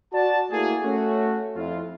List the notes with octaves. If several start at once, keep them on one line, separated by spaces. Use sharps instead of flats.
F#4 D5 A5
A3 A#3 E4 F#4 G#4
A3 C#4 F#4
F2 E4 F4